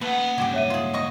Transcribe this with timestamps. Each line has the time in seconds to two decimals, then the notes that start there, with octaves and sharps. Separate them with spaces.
0.01 A3 A#3 A4 B4 F#5
0.17 B3
0.38 C#2 G2 C#4 F#4 G4
0.54 C#5 E5 D#7
0.70 F4 G#4
0.93 C3 D#5 C#6